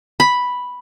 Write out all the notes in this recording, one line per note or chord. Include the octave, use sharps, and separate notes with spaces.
B5